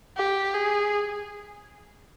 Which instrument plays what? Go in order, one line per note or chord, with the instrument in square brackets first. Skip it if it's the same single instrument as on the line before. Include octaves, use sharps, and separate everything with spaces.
[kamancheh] G4
G#4